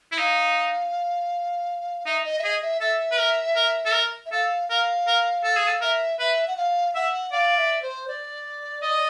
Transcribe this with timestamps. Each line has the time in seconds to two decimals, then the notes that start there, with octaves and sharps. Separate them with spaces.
0.12 E4
0.18 D#4 F5
2.06 D#4 E5
2.25 D#5
2.39 E5
2.43 G#4 D#5
2.62 E5
2.81 A4 E5
3.12 B4
3.19 A#4
3.56 A#4
3.86 A4
3.93 A#4
4.26 E5
4.32 A4 F5
4.69 A#4 F5
5.07 A#4
5.44 A4
5.56 G#4
5.67 A4
5.81 A#4 E5
6.20 B4 E5
6.47 F#5
6.57 F5
6.95 E5 F#5
7.32 D5 F5
7.57 E5
7.82 C5
8.08 D5
8.82 D#5